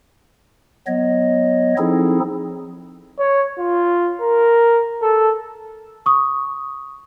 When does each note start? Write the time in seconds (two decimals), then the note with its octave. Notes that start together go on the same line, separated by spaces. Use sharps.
0.87 F#3 B3 C#5 D#5
1.78 F3 C4 D#4 E4 G#4 A4
3.19 C#5
3.59 F4
4.21 A#4
5.02 A4
6.06 C#6 D#6